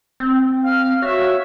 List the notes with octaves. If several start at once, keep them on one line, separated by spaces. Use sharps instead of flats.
C4
F5 F6
F#4 C#5 E5